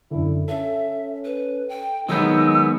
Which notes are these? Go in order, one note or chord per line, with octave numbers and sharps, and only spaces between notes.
F#2 D3 E4
C#4 A4 E5
B4
G5
D#3 F#3 G#3 B3 D#4 E6 G6